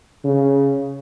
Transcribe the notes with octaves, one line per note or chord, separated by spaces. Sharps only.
C#3